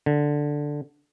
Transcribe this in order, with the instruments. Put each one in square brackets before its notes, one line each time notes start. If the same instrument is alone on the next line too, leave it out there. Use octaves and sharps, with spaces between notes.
[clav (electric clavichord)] D3